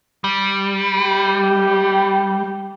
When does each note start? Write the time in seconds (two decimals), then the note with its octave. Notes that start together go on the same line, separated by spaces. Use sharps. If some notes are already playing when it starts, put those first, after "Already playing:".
0.24 G3
1.01 G4